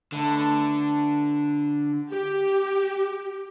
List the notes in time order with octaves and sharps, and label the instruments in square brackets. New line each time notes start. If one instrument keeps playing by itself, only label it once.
[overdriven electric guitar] D3 [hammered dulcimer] A3 A4 B4
[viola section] G4